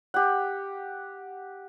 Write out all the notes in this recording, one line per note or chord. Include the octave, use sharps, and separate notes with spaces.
G4 F#5